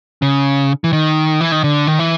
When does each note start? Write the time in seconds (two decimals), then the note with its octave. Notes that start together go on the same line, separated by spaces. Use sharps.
0.22 C#3
0.84 E3
0.93 D#3
1.41 E3
1.52 D#3
1.64 D3
1.87 D#3
1.99 E3